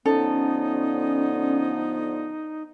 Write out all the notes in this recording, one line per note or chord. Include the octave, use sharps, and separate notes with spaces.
D3 F3 B3 C#4 D#4 A4